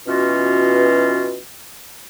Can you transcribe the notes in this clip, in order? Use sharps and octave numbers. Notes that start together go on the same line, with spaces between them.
B2 E3 C#4 F4 F#4